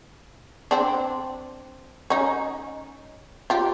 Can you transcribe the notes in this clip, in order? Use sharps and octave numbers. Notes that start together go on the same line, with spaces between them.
C4 D4
C#4 D#4
F4 G4